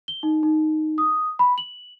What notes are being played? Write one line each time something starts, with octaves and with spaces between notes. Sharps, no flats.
G7
D#4
D#4
D#6
B5
F#7